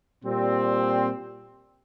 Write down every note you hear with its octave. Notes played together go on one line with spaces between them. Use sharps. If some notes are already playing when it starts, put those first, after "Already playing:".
A#2 G3 C4